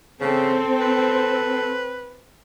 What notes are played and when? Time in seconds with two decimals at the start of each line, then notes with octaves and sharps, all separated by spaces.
0.21 C#3 C4 A4
0.81 B4